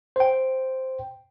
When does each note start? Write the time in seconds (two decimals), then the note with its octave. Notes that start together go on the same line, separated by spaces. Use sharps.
0.16 C5 G5